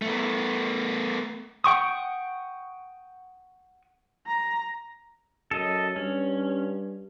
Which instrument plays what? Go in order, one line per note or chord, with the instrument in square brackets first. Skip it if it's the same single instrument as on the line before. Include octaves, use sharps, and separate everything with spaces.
[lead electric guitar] A3 B3
[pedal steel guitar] F#5 G5 C#6 D#6
[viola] A#5
[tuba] F#2 [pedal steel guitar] A4 D#5
[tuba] G2 [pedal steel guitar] C#4